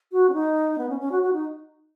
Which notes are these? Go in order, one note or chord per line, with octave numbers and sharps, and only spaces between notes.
F#4
C#4
D#4
B3
C#4
C#4
F#4
F#4
D#4